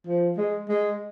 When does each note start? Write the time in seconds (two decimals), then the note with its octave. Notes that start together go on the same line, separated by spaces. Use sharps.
0.07 F3
0.37 G#3
0.69 G#3